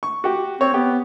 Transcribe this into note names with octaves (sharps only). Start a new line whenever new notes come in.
C#6
F#4 G4
C4 C#5
B3 G4